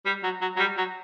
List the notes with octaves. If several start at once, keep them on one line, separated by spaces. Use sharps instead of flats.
G3
F#3
F#3
F#3
G3
F#3